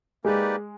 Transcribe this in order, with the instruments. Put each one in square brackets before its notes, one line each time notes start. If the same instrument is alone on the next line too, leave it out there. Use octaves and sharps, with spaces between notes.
[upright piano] G#3 [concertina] A#3 D#4 G4 B4 D5